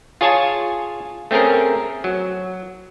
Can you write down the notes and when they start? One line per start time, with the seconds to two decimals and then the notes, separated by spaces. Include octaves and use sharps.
0.21 F4 G#4 C#5 G#5 A5
1.31 A3 C4 C#4 G#4 A#4
2.04 F#3